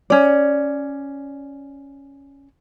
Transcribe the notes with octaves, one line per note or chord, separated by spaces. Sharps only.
C#4 D5